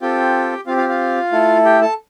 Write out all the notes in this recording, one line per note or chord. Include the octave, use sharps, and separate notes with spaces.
C4 F4 G4 A4 G5
C4 F4 G4 F5
F4 F5
F4 F5
A3 E4 A4
G4 G5
A4 A5